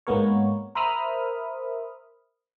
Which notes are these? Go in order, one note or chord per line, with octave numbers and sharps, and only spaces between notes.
G#2 G#3 A#3 B3 A#4 C#5
A#4 C5 E5 B5 D#6 F6